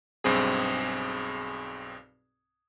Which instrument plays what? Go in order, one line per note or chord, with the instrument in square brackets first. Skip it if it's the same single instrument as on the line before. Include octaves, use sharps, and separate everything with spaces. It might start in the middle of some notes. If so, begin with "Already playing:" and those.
[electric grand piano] B1 G2 C4 G#4